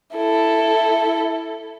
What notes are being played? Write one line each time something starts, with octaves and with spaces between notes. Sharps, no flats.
E4 A4